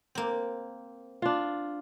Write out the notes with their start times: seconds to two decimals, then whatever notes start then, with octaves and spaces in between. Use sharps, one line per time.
0.15 A#3 C4
1.22 D4 F4